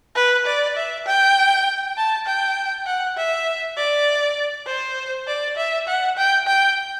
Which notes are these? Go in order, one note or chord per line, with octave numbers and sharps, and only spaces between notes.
B4
D5
E5
G5
A5
G5
F#5
E5
D5
C5
D5
E5
F#5
G5
G5